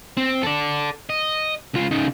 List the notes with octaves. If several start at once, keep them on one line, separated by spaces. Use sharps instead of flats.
C4
A4 D5
D#5
C#2 F4
C#3 D#4